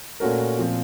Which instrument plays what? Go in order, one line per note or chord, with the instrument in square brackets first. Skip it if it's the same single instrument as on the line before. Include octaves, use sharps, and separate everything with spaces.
[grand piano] A#2 A3 C#4 F#4 A#4
A#2 F3 C4